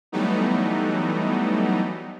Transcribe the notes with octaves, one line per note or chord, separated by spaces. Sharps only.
E3 F#3 G3 A3 B3 D#4